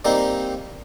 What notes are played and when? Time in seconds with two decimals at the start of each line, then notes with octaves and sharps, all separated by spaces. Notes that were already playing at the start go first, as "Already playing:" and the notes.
0.05 G3 A#3 C4 D#4